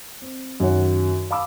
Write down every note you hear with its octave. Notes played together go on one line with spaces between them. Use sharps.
C4
F#2 D#3 C#5 F#5
F5 A5 B5 D6 E6